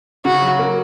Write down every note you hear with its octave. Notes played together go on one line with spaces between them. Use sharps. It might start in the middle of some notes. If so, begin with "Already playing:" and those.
C#3 F#4
F#3
A#3